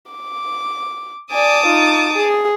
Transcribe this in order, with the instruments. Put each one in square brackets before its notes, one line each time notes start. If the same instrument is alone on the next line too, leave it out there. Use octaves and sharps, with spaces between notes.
[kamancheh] D6
[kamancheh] D5 G#5 [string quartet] A5 D6 D#6
[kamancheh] D#4 F4
G#4